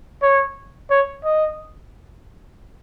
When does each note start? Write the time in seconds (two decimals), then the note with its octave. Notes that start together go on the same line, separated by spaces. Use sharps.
0.22 C#5
0.91 C#5
1.24 D#5